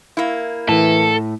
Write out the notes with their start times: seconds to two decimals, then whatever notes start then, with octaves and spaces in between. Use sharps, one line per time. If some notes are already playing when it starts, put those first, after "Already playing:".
0.17 A#3 E4
0.69 A2 E3 A4